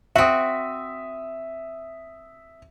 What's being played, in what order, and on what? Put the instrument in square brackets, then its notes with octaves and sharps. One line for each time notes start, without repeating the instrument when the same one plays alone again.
[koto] C4 F#4 [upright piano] E5 D#6